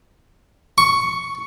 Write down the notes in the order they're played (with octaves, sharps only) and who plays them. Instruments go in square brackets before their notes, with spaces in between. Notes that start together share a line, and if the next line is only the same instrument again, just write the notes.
[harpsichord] C#6